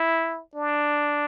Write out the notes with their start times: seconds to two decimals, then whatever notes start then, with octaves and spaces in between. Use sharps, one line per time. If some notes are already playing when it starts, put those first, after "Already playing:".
Already playing: E4
0.55 D4